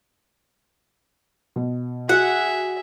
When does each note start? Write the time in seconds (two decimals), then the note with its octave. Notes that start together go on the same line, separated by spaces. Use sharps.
1.56 B2
2.09 F#4 G#4 E5 F#5